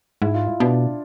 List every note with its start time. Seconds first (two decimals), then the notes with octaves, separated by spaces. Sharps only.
0.22 G#2 E4
0.34 F4
0.47 E4
0.60 B2 D4